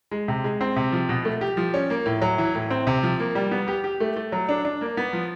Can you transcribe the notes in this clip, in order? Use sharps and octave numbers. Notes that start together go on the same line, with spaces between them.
G#3
C3
G#3
C4
C3
F3
B2
A3
G4
F3
C#4
A#3
A2
F#3
E3
A2
C4
C3
F3
A#3
G3
B3
G4
G4
A3
A3
F#3
D4
D4
A#3
B3
F3